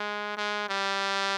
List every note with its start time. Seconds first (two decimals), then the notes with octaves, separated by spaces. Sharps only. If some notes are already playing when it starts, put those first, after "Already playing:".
Already playing: G#3
0.37 G#3
0.69 G3